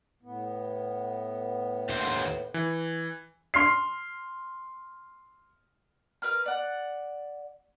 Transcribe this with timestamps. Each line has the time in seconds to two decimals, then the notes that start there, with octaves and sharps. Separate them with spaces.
0.23 A2 B3
1.89 D#2 C5
2.54 E3
3.54 C6 F6 C7
6.22 A#4 B4 F6
6.46 D5 F#5